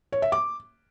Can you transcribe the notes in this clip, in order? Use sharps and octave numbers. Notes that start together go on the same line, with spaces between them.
C#5
E5
D6